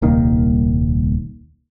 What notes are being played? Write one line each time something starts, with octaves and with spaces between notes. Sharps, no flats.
D#1 C2 D#3 A#3